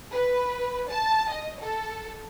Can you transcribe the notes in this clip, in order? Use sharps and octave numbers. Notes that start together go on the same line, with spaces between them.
B4
A5
D#5
A4